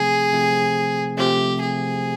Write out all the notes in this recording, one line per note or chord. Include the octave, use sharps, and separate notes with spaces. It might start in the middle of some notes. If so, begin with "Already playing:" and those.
Already playing: C3 F3 A3 C4 G#4
C3 F3 A3 C4
C3 F3 A3 C4 G4
G#4